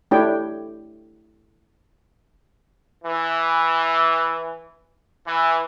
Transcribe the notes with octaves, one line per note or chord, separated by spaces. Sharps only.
A3 D4 E4 G4 C#5 G5
E3
E3